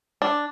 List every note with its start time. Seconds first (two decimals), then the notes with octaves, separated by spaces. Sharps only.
0.22 D4